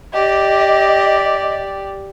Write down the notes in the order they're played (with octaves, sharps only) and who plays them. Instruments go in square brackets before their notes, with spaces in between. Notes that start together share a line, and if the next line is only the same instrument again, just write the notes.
[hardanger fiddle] G4 D5 [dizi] D#5